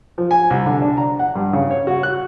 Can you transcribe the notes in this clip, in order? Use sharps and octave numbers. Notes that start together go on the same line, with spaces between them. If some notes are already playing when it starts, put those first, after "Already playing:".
F3
G#5
C2
D3
D4
A#5
F#5
G2
C#3
C#5
F#4
F#6